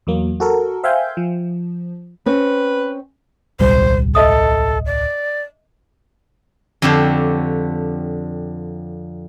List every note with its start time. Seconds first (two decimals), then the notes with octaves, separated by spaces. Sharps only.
0.07 E2 F#3 A#3
0.40 F#4 A4 A#4
0.83 C5 E5 F5 G5 G#5 G6
1.17 F3
2.26 C4 C#4 B4
3.60 D1 B1 G3 C5
4.15 A4 D#5 E5 D#6
4.86 D5
6.82 F2 D3 D4 G4 C5 C#5